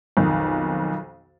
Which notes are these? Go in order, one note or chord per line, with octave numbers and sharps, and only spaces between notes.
B1 F2 D#3